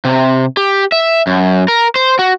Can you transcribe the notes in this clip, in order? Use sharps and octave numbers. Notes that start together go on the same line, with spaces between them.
C3
G4
E5
F#2
A#4
C5
F#4